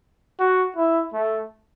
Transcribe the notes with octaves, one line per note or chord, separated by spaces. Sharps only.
F#4
E4
A3